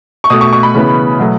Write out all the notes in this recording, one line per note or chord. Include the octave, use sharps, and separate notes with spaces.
C#6
B2 A3 D#6
C#6
C#6
B5
C#3 E3 B3
B2 F#3 A3